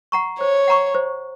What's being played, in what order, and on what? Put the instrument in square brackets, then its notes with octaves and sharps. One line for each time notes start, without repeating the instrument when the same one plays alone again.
[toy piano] F#5 A#5 C#6
[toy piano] C5 [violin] C#5
[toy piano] F#5 A#5 C#6
C5